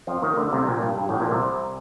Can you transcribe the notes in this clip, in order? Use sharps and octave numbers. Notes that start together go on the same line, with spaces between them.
F2 F3
D#2 D#3
D2 D3
C2 C3
A#1 A#2
G2
G2
A1 A2
A#1 A#2
C2 C3